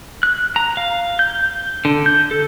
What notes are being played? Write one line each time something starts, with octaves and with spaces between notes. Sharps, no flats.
F#6
A#5
F5
G6
D3
G6
A4